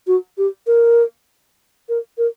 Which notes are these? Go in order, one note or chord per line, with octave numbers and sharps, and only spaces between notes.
F#4
G4
A#4
A#4
A#4